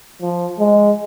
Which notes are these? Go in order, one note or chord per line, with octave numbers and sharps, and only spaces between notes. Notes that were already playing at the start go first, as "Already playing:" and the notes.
F3
G#3